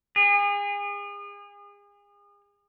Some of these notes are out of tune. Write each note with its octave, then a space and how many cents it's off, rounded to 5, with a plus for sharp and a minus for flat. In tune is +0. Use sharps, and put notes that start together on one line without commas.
G#4 -35